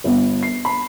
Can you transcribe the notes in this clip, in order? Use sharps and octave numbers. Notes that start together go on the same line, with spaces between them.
G1
C7
B5